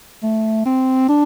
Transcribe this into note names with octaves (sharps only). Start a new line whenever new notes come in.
A3
C4
D4